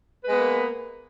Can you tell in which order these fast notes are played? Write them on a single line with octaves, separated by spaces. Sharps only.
B4 G#3 B3 A#3